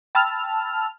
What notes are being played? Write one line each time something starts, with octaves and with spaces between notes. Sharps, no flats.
G5 A5 B5 E6 F6